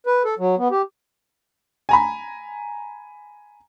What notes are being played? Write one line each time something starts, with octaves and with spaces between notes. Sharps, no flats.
B4
A4
F#3
B3
G4
G#5 A#5 B5